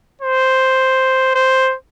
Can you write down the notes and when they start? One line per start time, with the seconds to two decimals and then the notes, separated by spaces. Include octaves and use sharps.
0.21 C5
1.35 C5